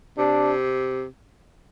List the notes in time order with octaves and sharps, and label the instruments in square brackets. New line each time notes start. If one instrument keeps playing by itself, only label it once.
[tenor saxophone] C3 [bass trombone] D4